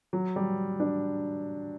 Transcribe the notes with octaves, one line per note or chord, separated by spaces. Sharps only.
F#3
G3
D4